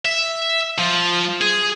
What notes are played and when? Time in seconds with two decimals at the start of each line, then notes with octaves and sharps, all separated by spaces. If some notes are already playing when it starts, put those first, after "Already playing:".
0.05 E5
0.78 F3
1.41 G#4